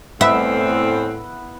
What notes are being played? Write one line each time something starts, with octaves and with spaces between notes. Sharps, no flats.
E2 A2 D3 B3 C4 E4 E5 F#5